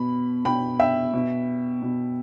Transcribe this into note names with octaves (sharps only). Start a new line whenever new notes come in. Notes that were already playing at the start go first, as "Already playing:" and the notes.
Already playing: B2 B5
B2 G5 B5
E5 G5
B2
B2